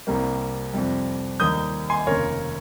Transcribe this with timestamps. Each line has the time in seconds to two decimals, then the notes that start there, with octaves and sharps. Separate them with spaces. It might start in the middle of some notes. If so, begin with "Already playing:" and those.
0.07 C2 C3 G3 A#3
0.73 F2 C3 G3
1.40 D#2 D#3 G3 A#3 D#6 G6
1.90 G#5 C6
2.07 F1 D#2 C#3 A#4 C#5